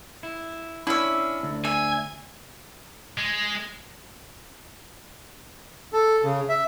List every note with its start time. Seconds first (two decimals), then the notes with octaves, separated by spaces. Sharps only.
0.23 E4
0.87 C#4 D4 E4 E5
1.43 D2
1.65 E5 G#5
3.18 G#3
5.93 A4
6.24 C#3
6.49 E5